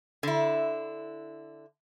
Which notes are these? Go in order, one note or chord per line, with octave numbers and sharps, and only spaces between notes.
D3 E4